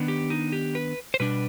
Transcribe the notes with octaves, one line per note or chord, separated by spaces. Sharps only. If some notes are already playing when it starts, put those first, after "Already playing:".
Already playing: D#3 B3 D4
G4
D#4
G4
B4
C5
B2 G3 D4 B4